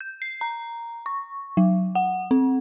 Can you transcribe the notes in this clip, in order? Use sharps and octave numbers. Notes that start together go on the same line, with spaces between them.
G6
C7
A#5
C#6
F#3
F#5
C4